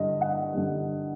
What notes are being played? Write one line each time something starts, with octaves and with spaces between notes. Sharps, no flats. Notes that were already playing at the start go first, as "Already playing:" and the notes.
Already playing: G2 D3 D#5
F#5
G2 D3